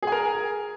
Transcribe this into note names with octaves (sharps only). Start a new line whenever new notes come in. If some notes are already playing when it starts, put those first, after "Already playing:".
G#4 A#4 G#5